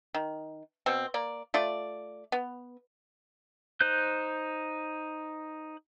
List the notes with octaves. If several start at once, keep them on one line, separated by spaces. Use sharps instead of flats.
D#3
B2 C4
A#3 D5
A3 F4 D5
B3
D#4 C5 F#6 G6